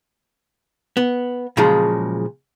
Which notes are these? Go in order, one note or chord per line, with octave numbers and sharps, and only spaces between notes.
B3
A#2 C#3 F3 F#3 G#3